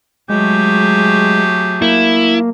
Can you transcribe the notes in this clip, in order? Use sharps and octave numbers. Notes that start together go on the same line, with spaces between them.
F#3 G#3 A3 G4 G#4
A#3 E4